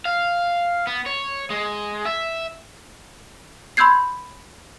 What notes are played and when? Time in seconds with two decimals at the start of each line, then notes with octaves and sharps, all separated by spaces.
0.05 F5
0.87 B3
1.06 C#5
1.50 G#3
2.05 E5
3.77 B5 C6 E6 G6 G#6 C7